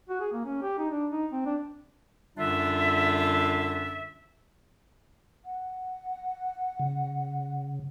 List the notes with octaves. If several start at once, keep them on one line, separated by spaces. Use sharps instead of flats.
F#4
G#4
A#3
C#4
G4
D#4
D4
D#4
C4
D4
F#2 D3 G3 D4 F4 E5
F#5
C#3